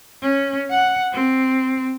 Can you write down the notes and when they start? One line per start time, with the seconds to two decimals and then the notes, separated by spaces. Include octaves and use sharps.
0.22 C#4
0.70 F#5
1.12 C4